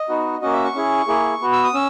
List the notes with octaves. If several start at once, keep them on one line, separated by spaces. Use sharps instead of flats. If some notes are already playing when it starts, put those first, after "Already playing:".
Already playing: D#5
B3 D#4 F#4
A#3 C#4 F#4 D#5
E5
C#6
C#4 E4 G#4
A#3 E4 G#4
B3 F#4
E6
D#6
C#4 E6